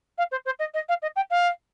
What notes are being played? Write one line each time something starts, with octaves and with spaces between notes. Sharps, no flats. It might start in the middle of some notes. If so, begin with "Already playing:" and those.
F5
C5
C5
D#5
D#5
F5
D#5
G5
F5